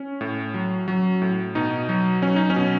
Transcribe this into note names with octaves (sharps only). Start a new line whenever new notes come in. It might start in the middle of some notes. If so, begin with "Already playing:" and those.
Already playing: C#4
A2
F#3
F#3
A2
B2 D#4
F#3
F#3 C#4
D#4
C#4
B2